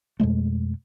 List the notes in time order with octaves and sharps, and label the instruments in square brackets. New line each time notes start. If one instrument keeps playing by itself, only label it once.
[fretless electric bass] F2 B2 G#3 A3